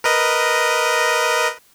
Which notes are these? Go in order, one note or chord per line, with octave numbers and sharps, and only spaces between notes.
A#4 B4 D#5